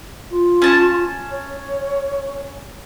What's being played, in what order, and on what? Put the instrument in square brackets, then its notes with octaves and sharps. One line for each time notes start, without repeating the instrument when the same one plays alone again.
[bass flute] F4
[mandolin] C#4 A5
[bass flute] C#5